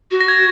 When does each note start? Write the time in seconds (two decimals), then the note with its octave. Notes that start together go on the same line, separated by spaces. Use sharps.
0.11 F#4
0.21 A#6
0.28 G#6